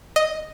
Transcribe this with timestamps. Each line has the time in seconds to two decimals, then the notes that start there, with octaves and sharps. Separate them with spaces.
0.16 D#5